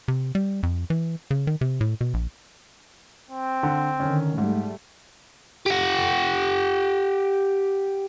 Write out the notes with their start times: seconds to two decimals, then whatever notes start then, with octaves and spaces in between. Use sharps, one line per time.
0.08 C3
0.35 G3
0.63 F2
0.90 E3
1.31 C#3
1.47 D#3
1.61 C3
1.81 A2
2.01 B2
2.14 A#1
3.31 C4
3.63 D3
4.00 D3 D#3 C#4
4.38 G#2 G3 A3
5.66 G4 F#5